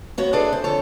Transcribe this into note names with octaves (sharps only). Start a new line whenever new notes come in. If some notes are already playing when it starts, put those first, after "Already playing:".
B3 F#4 C#5
D4 E4 G#4 A4 B4 D5
E2 C5
F2 D3 A4 C#5